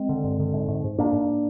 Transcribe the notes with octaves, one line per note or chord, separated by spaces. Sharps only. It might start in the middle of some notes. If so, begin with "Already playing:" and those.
Already playing: G#3 C4
D3
G2
D3
G#2
G#2
G#2
G#2 A#3 D4
G#2